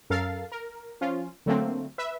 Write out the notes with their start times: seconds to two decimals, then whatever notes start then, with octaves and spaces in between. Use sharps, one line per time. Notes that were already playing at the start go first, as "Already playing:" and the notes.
0.10 F#2 A4 A#4 F5 A6 C7
0.52 A#4
1.01 F3 C#4 F4
1.46 D3 F#3 A3 A#3 C4
1.98 B4 E5